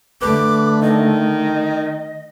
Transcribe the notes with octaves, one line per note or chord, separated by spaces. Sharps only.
D3 A3 B4 D6
D#3 D#5